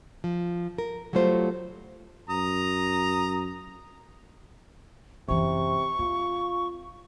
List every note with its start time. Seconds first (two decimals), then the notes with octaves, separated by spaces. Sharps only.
0.24 F3
0.78 A#4
1.13 F#3 G3 A3 F4 C5
2.29 F#2 A#5 D#6
5.28 F#2 C3 E3 C#6
5.99 C4 F4